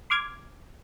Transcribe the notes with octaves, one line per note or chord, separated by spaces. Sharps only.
C6 D6 F6 G#6